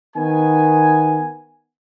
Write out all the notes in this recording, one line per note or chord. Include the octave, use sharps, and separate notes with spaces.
D#3 B3 G#5